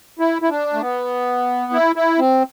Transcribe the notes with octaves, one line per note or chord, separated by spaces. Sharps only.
E4
E4
D4
A3
B3
E4
E4
C4